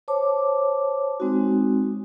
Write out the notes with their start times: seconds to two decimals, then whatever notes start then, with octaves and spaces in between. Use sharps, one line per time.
0.08 C5 C#5 A5 D6
1.20 G#3 C4 D#4 F#4